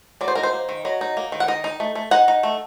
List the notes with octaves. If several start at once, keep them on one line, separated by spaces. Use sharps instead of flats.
F#3 D5
C5
D#4 A#4
C5
A#3
D#3
F#3 D#5
D#4
A#3
D#3
F#5
D#4 D#5
D#4
A3
A3
D#4 F#5
D#4
A3